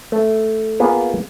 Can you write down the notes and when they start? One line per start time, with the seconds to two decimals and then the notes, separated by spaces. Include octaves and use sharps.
0.12 A3
0.80 A#3 B3 F4 G#4